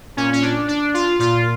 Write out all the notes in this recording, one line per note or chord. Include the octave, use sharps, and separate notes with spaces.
A#2 C#4
C#4
D4
D4
F4
A#2 F4